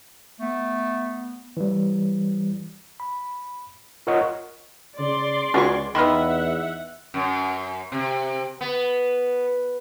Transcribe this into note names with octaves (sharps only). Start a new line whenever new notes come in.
A3 B3
E3 G3
B5
F4 A#4 C#5 D#5 F#5 C#6
C#3 D5 C6
C#2 B3 C#4 F4 F#4 G#4 C#6
E2 D#3 B3 E5 F#5 B5 C6 F6
F#2
C3
B3